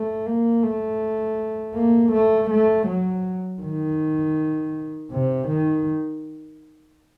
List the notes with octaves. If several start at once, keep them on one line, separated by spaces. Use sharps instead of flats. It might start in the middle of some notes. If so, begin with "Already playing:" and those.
Already playing: A3
A#3
A3
A#3
A3
A3
F#3
D#3
C3
D#3